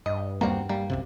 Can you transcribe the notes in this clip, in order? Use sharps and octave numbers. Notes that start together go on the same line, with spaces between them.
G2 D#5
D#2 G3 A#3 C4 F#4 A#5
G3 A#3
C2 F#2 C3